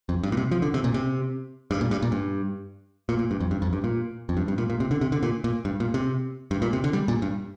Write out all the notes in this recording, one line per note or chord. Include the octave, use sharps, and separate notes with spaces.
F2
G2
A#2
C3
F3
D3
C3
A#2
C3
G2
A#2
G2
A#2
G2
A#2
A#2
G2
F2
G2
F2
G2
A#2
F2
G2
G2
A#2
A#2
C3
D3
C3
D3
A#2
A#2
G2
A#2
C3
G2
A#2
C3
D3
G3
A#2
G2